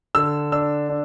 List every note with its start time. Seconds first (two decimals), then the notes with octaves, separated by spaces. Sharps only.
0.15 D3 E6
0.52 D4 E6
0.89 D4